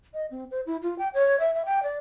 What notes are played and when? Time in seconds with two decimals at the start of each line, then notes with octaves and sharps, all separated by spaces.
0.14 D#5
0.31 C4
0.51 C5
0.66 E4
0.82 F4
0.98 G5
1.14 C#5
1.40 E5
1.54 E5
1.66 G5
1.83 D5